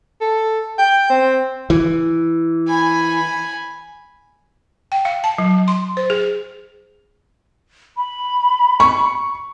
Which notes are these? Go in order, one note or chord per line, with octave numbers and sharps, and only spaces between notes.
A4
G5
C4
E3
G#5 B5
G5
F5
A5
F#3
C6
C5
G#4
B5
C#6